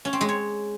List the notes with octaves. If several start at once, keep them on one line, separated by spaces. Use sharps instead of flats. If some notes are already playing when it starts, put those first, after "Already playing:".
C#4
C4
G#3
C#5